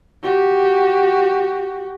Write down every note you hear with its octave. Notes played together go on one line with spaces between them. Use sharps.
F#4 G4